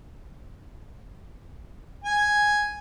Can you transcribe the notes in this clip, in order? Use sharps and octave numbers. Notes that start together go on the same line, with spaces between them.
G#5